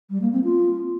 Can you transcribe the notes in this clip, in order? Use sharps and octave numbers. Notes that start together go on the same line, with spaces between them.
G3
A#3
C4
F4